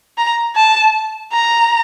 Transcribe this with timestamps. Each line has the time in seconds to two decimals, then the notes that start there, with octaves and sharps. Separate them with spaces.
0.18 A#5
0.56 A5
1.32 A#5